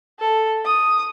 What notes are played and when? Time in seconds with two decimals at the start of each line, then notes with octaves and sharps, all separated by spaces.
0.20 A4
0.65 D#6